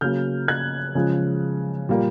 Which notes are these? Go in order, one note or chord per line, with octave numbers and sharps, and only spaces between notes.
C#3 F#3 A#3 F6 G6
F#6 G#6
C#3 F3 G#3
A#2 G3 A#3